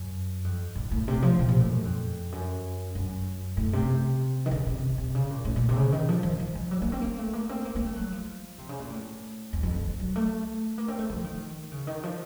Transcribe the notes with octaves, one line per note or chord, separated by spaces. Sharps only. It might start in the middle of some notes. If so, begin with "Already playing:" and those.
Already playing: F#2
F2
A2
A2
C3
F3
C3
A#2
A2
F#2
F2
F#2
F#2
A2
C3
D#3
C#3
C3
C3
C#3
A#2
A2
A#2
C3
C#3
D#3
F3
F3
F3
F3
F#3
A#3
C4
A#3
A3
A#3
C4
A#3
A#3
A3
F#3
F3
C3
C#3
A#2
A2
F2
F2
D#3
F#3
A3
A#3
C4
A3
F3
D#3
C#3
D#3
F3